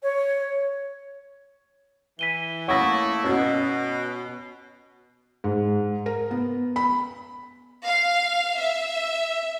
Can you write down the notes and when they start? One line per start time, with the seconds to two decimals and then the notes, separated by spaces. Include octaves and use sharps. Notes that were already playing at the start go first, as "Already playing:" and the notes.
0.03 C#5
2.19 E3 B6 D#7 G7
2.68 A3 A#3 E4 C#5 F#5 C#6 D#6 A#6
3.24 B2 C#4 F#4
5.44 G#2
6.06 A#4
6.31 B3
6.76 B5
7.87 F5
8.58 E5